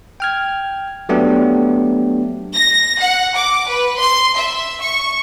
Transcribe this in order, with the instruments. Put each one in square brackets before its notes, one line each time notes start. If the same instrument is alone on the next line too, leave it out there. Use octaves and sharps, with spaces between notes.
[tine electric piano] G5 F6 G#6
F#3 A3 B3 D4 G4
[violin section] A#6
F#5
D6
B4
C6
E5
C#6